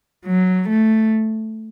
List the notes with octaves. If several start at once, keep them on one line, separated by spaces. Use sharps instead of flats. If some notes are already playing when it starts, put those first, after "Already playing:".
F#3
A3